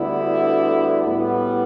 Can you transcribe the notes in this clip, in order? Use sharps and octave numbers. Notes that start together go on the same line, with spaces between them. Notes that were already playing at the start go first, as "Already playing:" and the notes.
Already playing: D2 D3 G3 B3 E4
A2 G3 B3